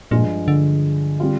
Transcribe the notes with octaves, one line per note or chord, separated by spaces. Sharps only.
G2 A#2 F3 G#3
D3
G3 C4 F4